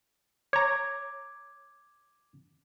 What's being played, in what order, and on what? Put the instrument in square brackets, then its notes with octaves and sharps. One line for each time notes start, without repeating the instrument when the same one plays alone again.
[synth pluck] C#5 A#5 [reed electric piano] D6 G#6